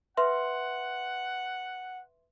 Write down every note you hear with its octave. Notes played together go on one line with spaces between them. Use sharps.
B4 E5 F#5 C6